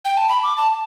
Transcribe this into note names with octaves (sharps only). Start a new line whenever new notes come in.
G5
A5
B5
D6
A5